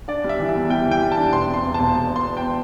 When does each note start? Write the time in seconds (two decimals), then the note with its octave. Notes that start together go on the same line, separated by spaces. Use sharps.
0.08 D4 D5
0.24 G3
0.29 E5
0.39 E3
0.49 E5
0.55 E2
0.70 G3 G5
0.86 E3
0.91 G5
1.01 G3
1.12 A5
1.18 D4
1.32 E1 C6
1.49 C3 C6
1.64 E2
1.74 A5
1.80 E1
1.95 E1 A5
2.11 E1
2.16 C6
2.26 E2
2.37 G5